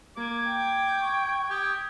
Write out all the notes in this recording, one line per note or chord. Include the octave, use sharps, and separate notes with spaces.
A#3 D6 G#6
G5
C#6
G4 D#6